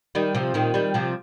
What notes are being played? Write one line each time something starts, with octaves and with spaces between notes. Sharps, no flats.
D#3 G3
C3 F3
A#2 D#3
D#3 G3
C3 F3